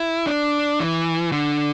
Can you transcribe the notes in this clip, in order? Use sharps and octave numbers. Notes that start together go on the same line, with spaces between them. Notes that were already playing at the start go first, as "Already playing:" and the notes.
Already playing: E4
D4
E3
D3